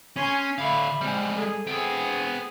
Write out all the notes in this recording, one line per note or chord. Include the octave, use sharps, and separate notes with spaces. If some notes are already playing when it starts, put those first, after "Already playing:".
C#4 G#5 C6
D3 E5 F5 B5
G3 G#3 C4
G#4 A4
B3 C4 G#4 G5